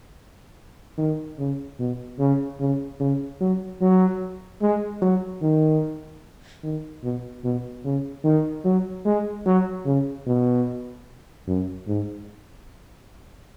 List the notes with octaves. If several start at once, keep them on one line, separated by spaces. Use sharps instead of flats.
D#3
C#3
B2
C#3
C#3
C#3
F#3
F#3
G#3
F#3
D#3
D#3
B2
B2
C#3
D#3
F#3
G#3
F#3
C#3
B2
F#2
G#2